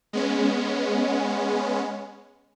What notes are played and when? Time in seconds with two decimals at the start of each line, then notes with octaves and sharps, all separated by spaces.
0.13 G#3 B3 C#4